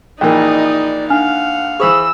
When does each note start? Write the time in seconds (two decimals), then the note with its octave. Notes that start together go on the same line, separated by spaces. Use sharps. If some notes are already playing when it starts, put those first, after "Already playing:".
0.21 A#1 E3 A#3 D#4 D5 D#5 G5
1.10 D4 F5 F#5 G#5 F6
1.80 E3 G#4 C5 B5 C#6 D#6 E6